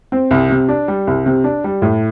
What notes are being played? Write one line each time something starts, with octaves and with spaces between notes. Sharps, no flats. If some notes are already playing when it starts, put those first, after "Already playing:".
C4
C2
C3
D4
G3
C2
C3
D4
G3
A2